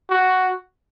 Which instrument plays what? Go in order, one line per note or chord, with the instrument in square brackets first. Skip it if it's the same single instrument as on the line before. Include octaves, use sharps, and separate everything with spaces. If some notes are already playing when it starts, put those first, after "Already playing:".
[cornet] F#4